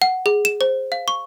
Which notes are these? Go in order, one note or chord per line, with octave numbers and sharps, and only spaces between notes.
F#5
G#4
E7
C5
F5
C#6